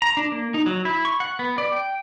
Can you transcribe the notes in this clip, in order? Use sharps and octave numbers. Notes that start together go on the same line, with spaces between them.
A#5
D4
A#3
D#4
F#3
E4
C#6
F#5
B3
D5
G5